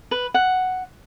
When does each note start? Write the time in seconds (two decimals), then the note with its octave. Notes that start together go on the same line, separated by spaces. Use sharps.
0.11 B4
0.34 F#5